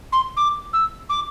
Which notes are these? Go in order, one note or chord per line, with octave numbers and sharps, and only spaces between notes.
C6
D6
E6
D6